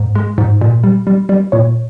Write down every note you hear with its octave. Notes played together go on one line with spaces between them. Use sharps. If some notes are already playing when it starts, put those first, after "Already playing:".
Already playing: G#2
G#3
G#2
A#2
G3
G3
G3
A#2 C#5